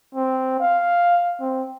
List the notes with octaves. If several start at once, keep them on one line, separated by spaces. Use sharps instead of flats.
C4
F5
C4